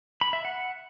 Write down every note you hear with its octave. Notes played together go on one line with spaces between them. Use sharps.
B5
E5
F#5